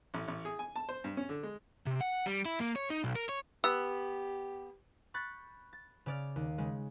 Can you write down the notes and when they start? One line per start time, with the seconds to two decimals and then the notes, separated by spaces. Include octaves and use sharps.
0.14 A1
0.28 A1
0.45 G#4
0.59 G#5
0.76 A5
0.89 C5
1.04 G2
1.17 C#4
1.29 D3
1.43 G#3
1.86 C3
2.01 F#5
2.26 G3
2.45 E4
2.60 A#3
2.76 C#5
2.90 D#4
3.04 B1
3.16 A#4
3.29 C#5
3.64 B3 G4 E6
5.14 B5 C#6 F#6 G6 A6
5.73 A6
6.06 C#3 D5 F6
6.36 D#2
6.58 C#3 G#3